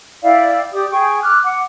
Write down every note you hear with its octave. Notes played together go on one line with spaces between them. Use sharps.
E4 D5 F5 G5
G4 D5 D#6
G#4 G5 C#6
D6 F6 F#6
F#5 D6